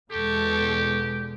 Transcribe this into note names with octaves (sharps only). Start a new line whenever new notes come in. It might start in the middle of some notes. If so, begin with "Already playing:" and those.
E2 B2 G#3 G4 A4 C#6